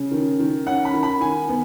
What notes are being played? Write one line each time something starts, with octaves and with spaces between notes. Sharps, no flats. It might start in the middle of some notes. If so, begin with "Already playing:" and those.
Already playing: C#3
D#3
D#3
C#4 F#5
B5
D#3
B5
D#3 G#5
B3